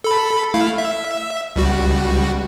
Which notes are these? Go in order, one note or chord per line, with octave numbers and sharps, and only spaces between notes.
A4 B5
A3 E4 F5
E5
C#2 G3 F#4